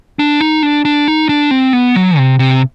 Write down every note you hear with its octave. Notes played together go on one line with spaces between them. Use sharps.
D4
D#4
D4
D4
D#4
D4
C4
B3
F#3
C3
C3